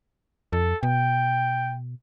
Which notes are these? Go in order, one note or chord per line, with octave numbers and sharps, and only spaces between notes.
F2 A4
B2 G5